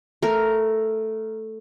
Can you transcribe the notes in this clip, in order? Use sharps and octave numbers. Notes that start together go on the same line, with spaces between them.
A3 A#4